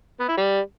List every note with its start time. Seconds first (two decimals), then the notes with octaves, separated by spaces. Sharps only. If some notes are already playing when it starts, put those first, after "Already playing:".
0.20 B3
0.29 E4
0.37 G3